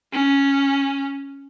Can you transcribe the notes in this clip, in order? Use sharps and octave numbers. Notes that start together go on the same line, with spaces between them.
C#4